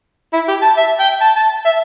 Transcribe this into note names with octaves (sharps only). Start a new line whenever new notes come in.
E4
G4
A5
E5
G5
A5
A5
E5